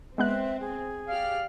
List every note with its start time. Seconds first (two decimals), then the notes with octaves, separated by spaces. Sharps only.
0.18 G#3 B3 C4 E5 F#6
0.61 G#4
1.08 G4 D5 F5 F6